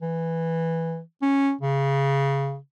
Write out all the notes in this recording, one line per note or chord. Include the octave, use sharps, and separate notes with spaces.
E3
C#4
C#3